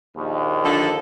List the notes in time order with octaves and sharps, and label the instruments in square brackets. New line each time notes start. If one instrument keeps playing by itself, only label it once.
[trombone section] A#1 D#2
[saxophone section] D3 F3 A4